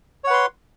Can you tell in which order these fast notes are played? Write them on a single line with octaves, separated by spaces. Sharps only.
C#5 F#5 B4 C6